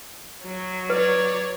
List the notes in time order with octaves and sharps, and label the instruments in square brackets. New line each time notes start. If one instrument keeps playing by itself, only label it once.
[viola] F#3
[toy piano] B4 [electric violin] C#5 D5